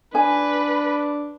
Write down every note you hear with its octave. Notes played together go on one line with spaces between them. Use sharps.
D4 B4 G#5